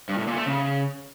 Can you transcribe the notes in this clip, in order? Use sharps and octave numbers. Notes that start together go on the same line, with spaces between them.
G2
A2
A#2
A3
C#3